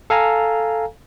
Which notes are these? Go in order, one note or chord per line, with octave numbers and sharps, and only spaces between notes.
A4 F5 G#5 A#5